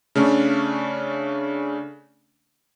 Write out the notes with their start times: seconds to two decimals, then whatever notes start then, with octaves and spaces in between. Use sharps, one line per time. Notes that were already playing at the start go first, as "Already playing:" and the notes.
0.15 C#3 A3 C#4 D4